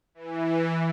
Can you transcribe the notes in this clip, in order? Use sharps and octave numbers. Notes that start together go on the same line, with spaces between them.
E3